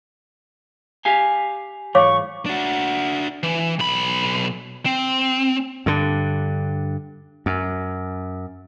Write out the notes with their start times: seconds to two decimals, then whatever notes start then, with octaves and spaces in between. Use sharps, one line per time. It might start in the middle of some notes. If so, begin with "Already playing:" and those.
1.05 G4 F5 G#5
1.95 G#2 E3 C#5 F5 C#6 D6
2.46 D4 F#4
3.43 E3
3.79 B1 B5
4.86 C4
5.86 G2 D3
7.46 F#2